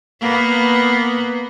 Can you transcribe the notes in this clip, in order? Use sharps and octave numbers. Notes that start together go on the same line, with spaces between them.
A#3 B3